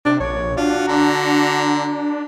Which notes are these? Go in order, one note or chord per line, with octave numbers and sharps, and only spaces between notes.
C3 D4
A#1 C#5
D4 F4 F#4
D3 A#5